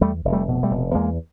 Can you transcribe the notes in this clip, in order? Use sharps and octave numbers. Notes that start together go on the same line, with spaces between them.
E2 G3 A3
F1
G3 A3
B2
G3 A3
F1
E2 G#3 A#3